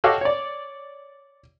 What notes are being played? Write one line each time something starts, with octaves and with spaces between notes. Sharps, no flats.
F#4 G4 A4 C#5 D#5 F5
C#5 D5